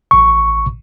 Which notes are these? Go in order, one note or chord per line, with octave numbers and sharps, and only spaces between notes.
A1 C#6